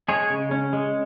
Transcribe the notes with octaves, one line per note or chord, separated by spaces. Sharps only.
G#3 G#4 C#5
C#3
C#4
G#3